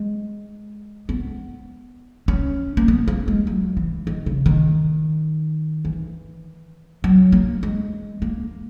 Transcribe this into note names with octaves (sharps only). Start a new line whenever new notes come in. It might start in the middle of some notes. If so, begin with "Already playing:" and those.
Already playing: G#3
B3
C#4
A#3
B3
A#3
G#3
F#3
E3
D#3
C#3
D#3
E3
F#3
A#3
G#3
A#3